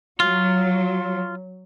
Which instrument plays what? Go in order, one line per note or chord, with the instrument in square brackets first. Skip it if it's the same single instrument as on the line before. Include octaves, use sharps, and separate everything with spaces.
[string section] F#3 [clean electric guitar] F4